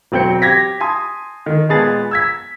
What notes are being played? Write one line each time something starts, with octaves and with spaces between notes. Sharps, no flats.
E1 F#3 C4 G5 G6 C#7
G4 G#6 A#6 B6
G#5 A5 C6 D#6
D#3
A#2 G#3 B3 G#4 A5 A6
E6 G#6 B6